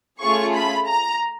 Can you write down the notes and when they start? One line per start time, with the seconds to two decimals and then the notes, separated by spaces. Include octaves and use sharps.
0.20 A3 C#4 F4 G#4 C#6
0.54 B5
0.88 A#5